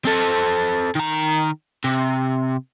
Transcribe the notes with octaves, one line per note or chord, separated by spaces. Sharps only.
C4 A4
D#3 A#5
C3